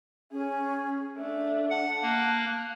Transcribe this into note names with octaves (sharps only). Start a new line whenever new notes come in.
C#4 G#4
A3 D4 E5
F#5 A5
A#3 F#6